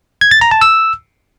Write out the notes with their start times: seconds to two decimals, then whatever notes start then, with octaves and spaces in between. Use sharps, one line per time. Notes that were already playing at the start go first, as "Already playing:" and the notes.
0.21 G#6
0.31 A6
0.41 A#5
0.51 A5
0.61 E6